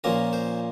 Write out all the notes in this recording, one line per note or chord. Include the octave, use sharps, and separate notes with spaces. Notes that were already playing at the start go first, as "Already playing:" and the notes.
A#2 F3 A#3 C#4 A#4
C5